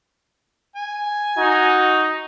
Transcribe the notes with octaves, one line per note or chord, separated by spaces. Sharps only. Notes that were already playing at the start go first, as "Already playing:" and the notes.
G#5
D#4 F#4